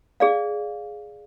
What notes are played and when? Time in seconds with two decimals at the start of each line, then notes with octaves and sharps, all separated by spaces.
0.20 G#4 D5 F5